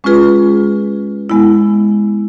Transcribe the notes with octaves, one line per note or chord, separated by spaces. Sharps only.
G#3 C#4 F4 G#4 B4
G#3 B3 E4